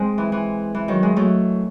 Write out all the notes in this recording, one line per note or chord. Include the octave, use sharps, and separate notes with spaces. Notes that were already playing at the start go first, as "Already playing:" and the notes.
Already playing: G#3 C4
E3
E3
E3
D#3 F#3
E3 G#3
F#3 A3